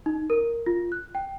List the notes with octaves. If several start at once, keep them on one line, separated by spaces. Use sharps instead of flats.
D#4
A#4
F4
F#6
G5